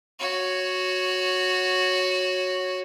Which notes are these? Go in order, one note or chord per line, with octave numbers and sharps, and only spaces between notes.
F#4 C#5